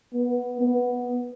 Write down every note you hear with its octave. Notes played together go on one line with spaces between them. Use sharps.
B3
B3